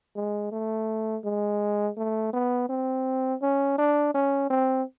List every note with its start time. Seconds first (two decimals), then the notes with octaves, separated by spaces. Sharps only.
0.16 G#3
0.52 A3
1.25 G#3
1.97 A3
2.33 B3
2.69 C4
3.42 C#4
3.78 D4
4.14 C#4
4.50 C4